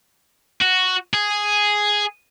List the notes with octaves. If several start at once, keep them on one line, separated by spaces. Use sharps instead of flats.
F#4
G#4